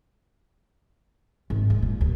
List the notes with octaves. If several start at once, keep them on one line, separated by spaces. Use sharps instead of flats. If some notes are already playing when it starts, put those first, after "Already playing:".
G#1
G#2
A#2
D#2